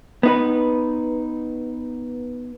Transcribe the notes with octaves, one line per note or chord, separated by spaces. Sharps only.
B3 D#4 B4